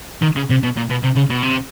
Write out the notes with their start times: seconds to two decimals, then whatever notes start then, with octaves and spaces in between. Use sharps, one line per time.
0.23 D#3
0.36 C#3
0.50 C3
0.63 B2
0.77 A#2
0.90 B2
1.03 C3
1.16 C#3
1.30 B2
1.42 C3